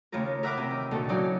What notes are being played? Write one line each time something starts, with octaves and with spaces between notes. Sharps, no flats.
D#2 C#3 A3 F4 A#4
A#4 E5 F#5 B5 D6 F6
C3
D#3
D2 A#2 D#3 A4
C#3 E3 F#3 D#4 D5